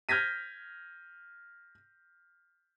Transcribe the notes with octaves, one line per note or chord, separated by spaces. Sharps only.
F6 G6 G#6 A#6 B6 D#7